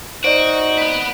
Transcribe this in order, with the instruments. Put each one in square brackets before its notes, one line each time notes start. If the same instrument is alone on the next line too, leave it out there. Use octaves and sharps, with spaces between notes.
[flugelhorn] D#4 [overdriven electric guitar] F#4 [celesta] C5 D5 [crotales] D7
[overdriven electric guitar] B4 F#5